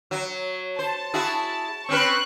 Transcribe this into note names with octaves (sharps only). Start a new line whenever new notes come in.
F#3
C5 A5
E4 F#4 G#4
C4 C#4 B4 C#6 F#6